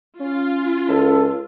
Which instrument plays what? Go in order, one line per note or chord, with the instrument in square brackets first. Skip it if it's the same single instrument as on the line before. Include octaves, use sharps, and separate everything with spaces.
[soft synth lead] C#4 [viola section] F4
[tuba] C#2 [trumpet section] A4